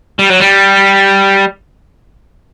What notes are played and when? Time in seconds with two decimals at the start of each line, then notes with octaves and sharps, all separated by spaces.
0.19 G3
0.30 F#3
0.40 G3